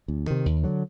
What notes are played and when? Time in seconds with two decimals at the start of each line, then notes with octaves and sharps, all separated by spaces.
0.08 D2
0.27 C3 D#3
0.46 D#2
0.63 D3 F#3